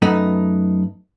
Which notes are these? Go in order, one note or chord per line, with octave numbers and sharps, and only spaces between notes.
F#2 A3 B3 D#4